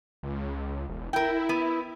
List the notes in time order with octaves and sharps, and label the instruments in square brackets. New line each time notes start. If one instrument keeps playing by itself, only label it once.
[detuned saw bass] C#2
E1
[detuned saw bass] E4 [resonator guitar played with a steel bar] A#4 G5
[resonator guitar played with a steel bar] B3